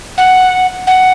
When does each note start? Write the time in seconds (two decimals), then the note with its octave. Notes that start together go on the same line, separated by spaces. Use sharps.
0.18 F#5
0.87 F#5